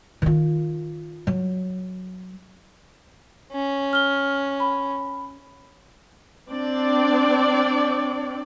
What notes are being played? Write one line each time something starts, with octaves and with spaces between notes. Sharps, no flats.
D#3 F4
F#3
C#4
F6 G7
B5
C4 D4 D5